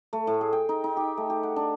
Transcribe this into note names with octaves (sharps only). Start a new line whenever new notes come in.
A3
A2
G#4
G5
D#4
D#4
G4
A3
G4
F#5
D4